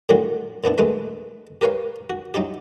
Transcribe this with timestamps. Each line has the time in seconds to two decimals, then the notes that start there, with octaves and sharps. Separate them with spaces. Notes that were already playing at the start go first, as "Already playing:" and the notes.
0.09 A2 D3 D#3 F#3 F4 F#4
0.64 A#2 B3 D4 E4
0.78 D#2 G#3 A3 B4 B5
1.61 G4 A#4 B4 C#5 F5
2.10 F#4
2.34 F#3 D#4 E4 G4